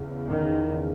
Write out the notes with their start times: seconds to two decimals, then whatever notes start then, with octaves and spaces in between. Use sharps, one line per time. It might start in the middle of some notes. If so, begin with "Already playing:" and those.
Already playing: E2 C#3
0.28 D#3